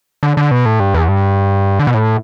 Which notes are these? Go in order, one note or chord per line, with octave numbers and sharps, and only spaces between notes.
D3
D3
B2
A2
G2
E2
G2
D3
B2
A2